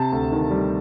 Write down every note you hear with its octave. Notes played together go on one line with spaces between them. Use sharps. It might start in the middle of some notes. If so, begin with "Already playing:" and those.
Already playing: C3 A5
D2
D#3
G3